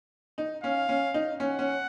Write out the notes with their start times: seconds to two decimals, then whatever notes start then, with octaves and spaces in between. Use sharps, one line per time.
0.38 D#4
0.63 C#4 F5
0.89 C#4
1.14 D#4
1.39 C#4 F#5
1.59 C#4